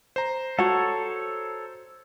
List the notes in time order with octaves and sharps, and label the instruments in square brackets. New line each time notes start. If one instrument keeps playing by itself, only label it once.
[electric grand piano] C5 A#5
[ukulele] F#4 F#5 [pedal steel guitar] A4 C#5